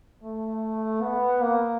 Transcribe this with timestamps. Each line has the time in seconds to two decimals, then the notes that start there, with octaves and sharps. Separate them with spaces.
0.23 A3
1.01 B3
1.42 A#3